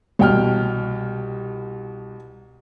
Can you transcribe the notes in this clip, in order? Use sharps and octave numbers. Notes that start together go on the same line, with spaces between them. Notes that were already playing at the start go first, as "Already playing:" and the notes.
C2 B2 G5 F6